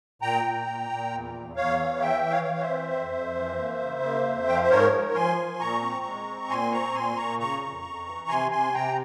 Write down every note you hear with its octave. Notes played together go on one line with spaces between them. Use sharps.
A#2 G5 A#5
A#2
A#2
A#2
E2
E2
E2 C#5 F5
E3
E3 E5 G5
E3
C#5 F5
E3
C5 E5
C4
F2
F2
E3
A#3
C#3
A#3
F2
F3 G5
F5
E5
G#2 A#4 C#5
G#2
F3 G#5 C6
F3
A#2 A#5 C#6
C4
G#3
C4
A#2 G#5 C6
C4 A#5 C#6
A#2 G#5 C6
A#2 A#5 C#6
C#3 A#5 C#6
F2
F2
E3
C3 G#5 C6
C3 G#5 C6
C3 G5 A#5